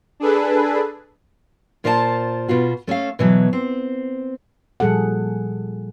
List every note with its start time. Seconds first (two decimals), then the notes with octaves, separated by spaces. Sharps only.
0.20 D4 G#4 A4 B4
1.84 A#2 F4 A#4 C5 D5 A5
2.48 B2 B3 F4 F#4
2.87 A3 C#4 A4 F5
3.19 B2 E3 F#3
3.53 C4
4.80 A#2 F3 G3 G#4 A4 F#5